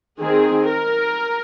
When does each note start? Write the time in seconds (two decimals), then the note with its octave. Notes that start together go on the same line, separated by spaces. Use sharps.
0.21 D#3 C4 G#4
0.70 A#4